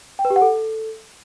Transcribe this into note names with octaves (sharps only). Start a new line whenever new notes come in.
G5
B4
G4
F#5
A4